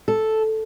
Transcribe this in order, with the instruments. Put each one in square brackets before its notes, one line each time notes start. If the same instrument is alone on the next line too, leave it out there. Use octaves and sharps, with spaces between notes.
[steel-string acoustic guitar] A4